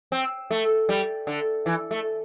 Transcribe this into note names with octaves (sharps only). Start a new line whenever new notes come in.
C4
A3
G3
D3
E3
A3